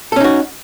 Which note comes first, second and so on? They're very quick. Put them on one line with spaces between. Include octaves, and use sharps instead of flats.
A4 C#4 D#4 F#4